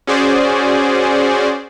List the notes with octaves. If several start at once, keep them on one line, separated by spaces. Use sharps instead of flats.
C#4 F#4 G#4 C5 D5